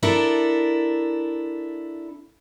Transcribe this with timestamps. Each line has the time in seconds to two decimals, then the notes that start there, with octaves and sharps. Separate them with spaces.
0.03 D4 E4 A4 A#4